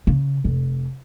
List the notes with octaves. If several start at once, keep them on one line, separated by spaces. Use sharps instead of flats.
C#3
F1